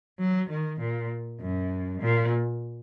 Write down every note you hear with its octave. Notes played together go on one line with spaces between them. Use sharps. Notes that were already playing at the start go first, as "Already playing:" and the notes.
F#3
D#3
A#2
F#2
A#2